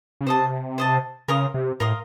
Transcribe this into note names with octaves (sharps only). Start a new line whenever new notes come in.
C#3
C3 C5 D#5 A5
C5 D#5 A5
C#3 A#4 F5 C6 D#6
C3
A2 A#4 F5 C6 D#6